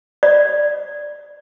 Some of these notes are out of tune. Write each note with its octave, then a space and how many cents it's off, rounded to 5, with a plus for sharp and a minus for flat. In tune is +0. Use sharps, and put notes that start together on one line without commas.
D5 +5